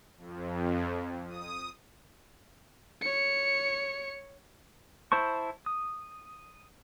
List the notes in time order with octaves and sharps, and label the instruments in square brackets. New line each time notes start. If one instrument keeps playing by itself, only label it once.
[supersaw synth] F2
D#6
[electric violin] C#5 C#7
[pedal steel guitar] E4 C5 A5 C#6
D#6